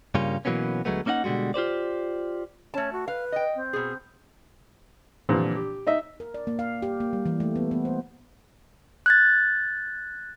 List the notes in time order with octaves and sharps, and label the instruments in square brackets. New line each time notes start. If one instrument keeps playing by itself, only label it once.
[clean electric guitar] G2 C#3 G3 A#3 C#4 F4
B2 E3 F#3 A#3 B3 C#4
D2 C3 F#3 G#3 A3 B3
A#3 C#4 D#4 D#5 F#5
B2 D3 G3 G#3 F#4
F4 G4 C5 D5
[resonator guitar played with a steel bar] A3 A5 [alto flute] C#4
[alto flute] F#4
[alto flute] B4 [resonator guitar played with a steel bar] F5
[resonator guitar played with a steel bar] D#5 G5
[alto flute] C4
[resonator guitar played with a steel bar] B2 G#4
[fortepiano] A#2 D3 E3 F3 G3 C4
G4
D#4 D#5 E5
[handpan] A#4
D5
A#3
F5
G4
A#3
G3
E3
A3
B3
B3
C5
[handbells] F#6 G#6 A6